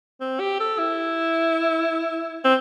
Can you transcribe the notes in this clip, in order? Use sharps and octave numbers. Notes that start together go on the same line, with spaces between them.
C4
G4
A4
E4
C4